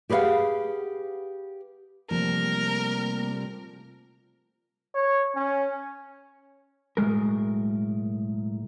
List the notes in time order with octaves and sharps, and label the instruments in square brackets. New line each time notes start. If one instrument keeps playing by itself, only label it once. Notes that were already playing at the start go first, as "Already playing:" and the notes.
[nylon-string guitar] G4 G#4 B4 C5 F5 F#5
[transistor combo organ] C3 G3 [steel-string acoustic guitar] F3 [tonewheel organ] A3 A#3 [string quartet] A#4
[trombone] C#5
C#4
[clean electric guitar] B1 A2 C3 G#3 A#4